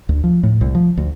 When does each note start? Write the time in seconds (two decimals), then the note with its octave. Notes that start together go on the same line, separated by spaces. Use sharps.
0.09 D2
0.24 F3
0.43 A2
0.61 C2
0.75 F3
0.97 D2